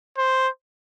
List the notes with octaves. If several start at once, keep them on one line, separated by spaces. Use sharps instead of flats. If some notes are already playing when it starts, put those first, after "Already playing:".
C5